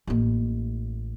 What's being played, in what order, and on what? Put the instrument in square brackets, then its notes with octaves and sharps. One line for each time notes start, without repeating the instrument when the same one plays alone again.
[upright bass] A1 A#3